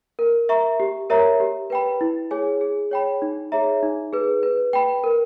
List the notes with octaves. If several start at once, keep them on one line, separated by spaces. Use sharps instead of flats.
A#4
E5 A#5 C#6
G4
A#4 C#5 E5 A#5
G4
B4 G5 B5
E4
G#4 C#5 G#5
G#4
C#5 G5 B5
D#4
G#4 C#5 E5 A#5
D#4
G#4 B4
B4
G5 B5
A#4